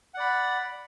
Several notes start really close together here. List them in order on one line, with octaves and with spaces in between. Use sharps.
F#5 D5 B5